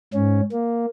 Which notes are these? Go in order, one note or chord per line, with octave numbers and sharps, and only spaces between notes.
G#2 C#4
A#3